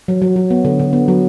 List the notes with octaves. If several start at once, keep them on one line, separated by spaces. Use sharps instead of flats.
F#3
F#3
F#3
B3
D3
D3
B3
F#3